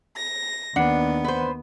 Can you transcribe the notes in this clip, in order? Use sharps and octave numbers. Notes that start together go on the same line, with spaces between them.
A#6
D#2 B3 D4 F#5 C#7
B4 C5